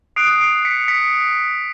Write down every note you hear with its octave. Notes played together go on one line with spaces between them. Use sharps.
D#6 F#6 C7 D7
C7 D7
B6 C#7
B6 C#7